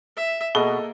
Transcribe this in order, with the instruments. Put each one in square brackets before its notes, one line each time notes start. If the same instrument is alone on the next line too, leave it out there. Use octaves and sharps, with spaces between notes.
[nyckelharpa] E5
[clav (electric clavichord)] B2 [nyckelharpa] A#3 [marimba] G#4 [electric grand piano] A4 D#5